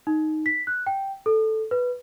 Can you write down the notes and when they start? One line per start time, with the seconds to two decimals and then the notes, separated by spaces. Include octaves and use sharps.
0.07 D#4
0.46 B6
0.67 F#6
0.87 G5
1.26 A4
1.71 B4